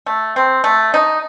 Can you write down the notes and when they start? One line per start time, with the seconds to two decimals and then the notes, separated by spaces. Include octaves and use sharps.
0.06 A3
0.36 C4
0.64 A3
0.94 D#4